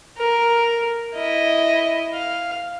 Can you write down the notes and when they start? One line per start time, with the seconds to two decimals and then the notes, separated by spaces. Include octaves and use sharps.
0.19 A#4
1.16 E4 D#5
2.14 F5